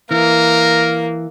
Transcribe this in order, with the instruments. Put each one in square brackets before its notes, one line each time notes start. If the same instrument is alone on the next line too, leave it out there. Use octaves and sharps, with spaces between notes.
[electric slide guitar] E3 [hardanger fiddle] A#3 [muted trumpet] A#4